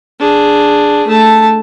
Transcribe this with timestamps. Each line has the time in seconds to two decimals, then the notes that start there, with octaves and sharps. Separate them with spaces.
0.20 D4 G#4
1.07 A3 A5